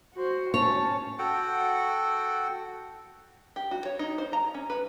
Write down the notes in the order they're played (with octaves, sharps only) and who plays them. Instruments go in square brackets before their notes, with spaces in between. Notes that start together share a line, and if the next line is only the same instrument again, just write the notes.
[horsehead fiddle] F#4 C5
[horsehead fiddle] C#4 A5 [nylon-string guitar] C#5
[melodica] F#4 A4 F#5 G5
[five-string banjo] G4
F#4
C#5
D#4
C5
A#5
C#4
B4